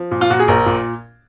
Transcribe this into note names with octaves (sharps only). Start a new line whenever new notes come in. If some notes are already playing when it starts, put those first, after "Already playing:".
Already playing: F3
A#2
F4
A#2 F#4
G#4
A#1 A#4
A#2